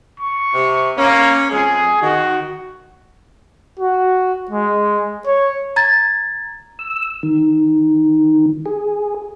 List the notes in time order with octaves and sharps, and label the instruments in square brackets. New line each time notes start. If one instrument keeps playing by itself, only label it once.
[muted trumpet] C#6
[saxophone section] C3
[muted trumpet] A#3 [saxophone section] C#4
[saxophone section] F2 G#3 [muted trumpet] G#4
[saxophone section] D#3 [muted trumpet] F#4
[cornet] F#4
G#3
C#5
[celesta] A#5 G#6 A6
[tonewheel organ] E6
D#3
G#4